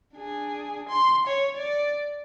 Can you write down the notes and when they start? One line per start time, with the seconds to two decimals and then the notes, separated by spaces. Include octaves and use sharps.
0.15 D4 G#4
0.89 C6
1.27 C#5
1.56 D5